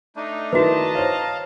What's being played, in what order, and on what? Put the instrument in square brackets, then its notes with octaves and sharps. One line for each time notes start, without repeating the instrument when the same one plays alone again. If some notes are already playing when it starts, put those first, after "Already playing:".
[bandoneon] A3 D4 [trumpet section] D#4
[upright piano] D#3 E4 [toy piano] F#4 B4 [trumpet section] D#5 A5 A#5
[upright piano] C5 C#5 [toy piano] E5 [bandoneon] F5